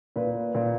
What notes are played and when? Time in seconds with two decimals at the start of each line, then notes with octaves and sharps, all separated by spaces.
0.16 A#2 B4
0.55 A#2